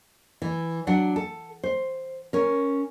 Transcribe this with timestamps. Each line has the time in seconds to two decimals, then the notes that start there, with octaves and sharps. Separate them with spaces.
0.42 E3
0.87 F#3 D4 F#5
1.16 A4
1.63 C5
2.33 C#4 A#4